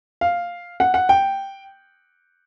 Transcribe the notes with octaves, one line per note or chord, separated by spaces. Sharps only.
F5
F#5
F#5
G5